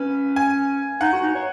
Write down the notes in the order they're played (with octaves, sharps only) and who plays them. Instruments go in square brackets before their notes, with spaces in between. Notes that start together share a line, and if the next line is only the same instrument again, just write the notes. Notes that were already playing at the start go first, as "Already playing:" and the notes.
Already playing: [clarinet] C#4 [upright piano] B4
[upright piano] G#5
[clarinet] D#4 [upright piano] F#5
[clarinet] F#4
D#4
C#5